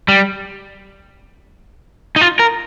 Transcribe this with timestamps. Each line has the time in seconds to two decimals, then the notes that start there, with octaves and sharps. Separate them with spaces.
0.08 G3
2.16 D#4
2.21 F4
2.39 A#4